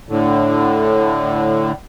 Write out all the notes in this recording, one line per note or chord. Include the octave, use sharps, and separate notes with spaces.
A2 D3